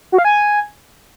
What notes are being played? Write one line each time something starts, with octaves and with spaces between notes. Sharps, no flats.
F#4
F5
G#5